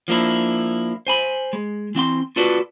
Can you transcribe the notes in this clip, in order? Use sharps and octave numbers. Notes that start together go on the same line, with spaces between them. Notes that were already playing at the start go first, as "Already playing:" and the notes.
F3 A#3 D4 E4
C5 G#5 B5
G#3
E3 C4 F#5 C6
F4 F#4 A4 B4 D5